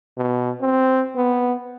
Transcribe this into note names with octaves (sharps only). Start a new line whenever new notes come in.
B2
C4
B3